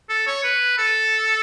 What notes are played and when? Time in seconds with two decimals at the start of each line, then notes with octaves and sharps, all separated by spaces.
0.09 A4
0.27 C#5
0.44 B4
0.78 A4